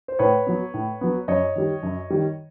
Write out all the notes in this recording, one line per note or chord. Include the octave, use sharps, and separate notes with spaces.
C5
A2 B4 C#5
F#3 B3
A2
F#3 B3
F#2 C#5 D#5
D#3 G3
F#2
D#3 G3